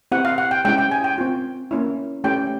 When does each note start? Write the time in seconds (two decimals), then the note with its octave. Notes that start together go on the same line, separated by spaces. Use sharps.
0.12 C4 E4 G4 F#5
0.25 F5
0.38 F#5
0.51 G5
0.65 G#3 C#4 E4 G4 G5
0.78 G5
0.91 G#5
1.04 G5
1.18 C4 F4
1.71 A#3 C#4 E4
2.24 A3 C#4 E4 G4 G5